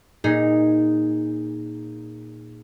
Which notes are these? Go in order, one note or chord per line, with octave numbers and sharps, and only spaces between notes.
A#2 D#4 G#4